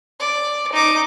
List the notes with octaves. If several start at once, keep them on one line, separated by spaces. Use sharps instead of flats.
D5
D#4 D6